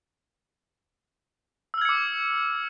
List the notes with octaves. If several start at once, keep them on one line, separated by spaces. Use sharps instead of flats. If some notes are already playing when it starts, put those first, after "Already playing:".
D6 E6 F6 G#6 C#7